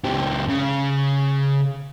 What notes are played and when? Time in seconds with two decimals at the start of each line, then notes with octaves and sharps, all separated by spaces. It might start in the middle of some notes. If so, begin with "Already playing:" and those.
0.05 C#2 G4
0.49 C#3